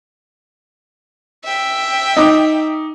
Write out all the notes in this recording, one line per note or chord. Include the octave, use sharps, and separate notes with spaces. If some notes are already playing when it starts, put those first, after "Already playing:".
E5 G5
D#4 D6